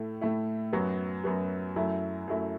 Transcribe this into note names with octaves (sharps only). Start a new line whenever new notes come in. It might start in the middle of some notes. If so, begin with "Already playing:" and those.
Already playing: A2 A3 E4
A2 A3 E4
F#2 F#3 B3 F#4
F#2 F#3 B3 F#4
F#2 F#3 A3 E4
F#2 F#3 A3 E4